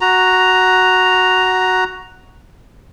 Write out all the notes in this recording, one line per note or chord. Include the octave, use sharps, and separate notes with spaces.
F#4 A#5